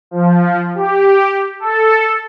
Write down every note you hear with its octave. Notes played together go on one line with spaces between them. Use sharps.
F3
G4
A4